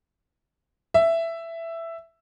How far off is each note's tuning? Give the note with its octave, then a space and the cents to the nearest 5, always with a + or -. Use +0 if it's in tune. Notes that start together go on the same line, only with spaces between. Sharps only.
E5 +10